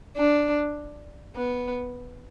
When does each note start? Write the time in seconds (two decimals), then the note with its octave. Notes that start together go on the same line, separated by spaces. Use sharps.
0.17 D4
1.35 B3